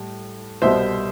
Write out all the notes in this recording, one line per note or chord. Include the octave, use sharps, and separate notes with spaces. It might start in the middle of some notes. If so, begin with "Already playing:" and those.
Already playing: A2 G3
C2 B2 G3 C5 E5